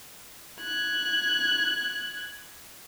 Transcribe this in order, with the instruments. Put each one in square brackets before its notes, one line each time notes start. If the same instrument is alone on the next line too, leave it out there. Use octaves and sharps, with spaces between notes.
[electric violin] F#6 G#6